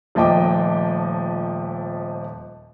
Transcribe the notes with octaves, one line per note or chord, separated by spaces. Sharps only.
D#1 F3 A3 D#5 G5 D6